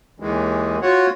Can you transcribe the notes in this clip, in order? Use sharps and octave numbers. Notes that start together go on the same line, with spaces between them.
D#2 D#3 E3 G#3
F4 F#4 C#5 F#5